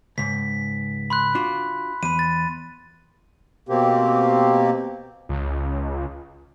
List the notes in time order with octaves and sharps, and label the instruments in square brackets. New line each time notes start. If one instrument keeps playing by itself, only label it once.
[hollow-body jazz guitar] C#2 G#2 [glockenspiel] B6
[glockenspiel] B5 C6 F#6
[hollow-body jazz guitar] D4 F4 F#4
[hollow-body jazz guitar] E2 [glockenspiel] B5 D#7
[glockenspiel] A6
[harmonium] B2 A#3 C4 G4
[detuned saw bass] C#2